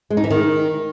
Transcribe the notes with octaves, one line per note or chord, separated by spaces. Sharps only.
G#3
D#4
E3
D#3